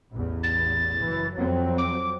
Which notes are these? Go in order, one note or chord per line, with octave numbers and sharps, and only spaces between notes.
A1 E2
A6
F#1 E3
F2 F#3 C4
D6